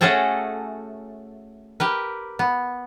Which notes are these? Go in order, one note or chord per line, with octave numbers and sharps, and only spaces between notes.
A3 C#4 F#4 G#4 A4 G5
G4 A#4 B4
B3